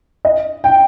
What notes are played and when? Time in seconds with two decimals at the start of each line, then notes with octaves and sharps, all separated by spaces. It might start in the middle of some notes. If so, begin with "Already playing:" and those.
0.25 D#5
0.64 G5